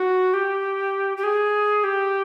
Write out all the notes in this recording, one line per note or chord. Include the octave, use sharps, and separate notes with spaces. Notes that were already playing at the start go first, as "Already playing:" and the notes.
Already playing: F#4
G4
G4
G#4
G4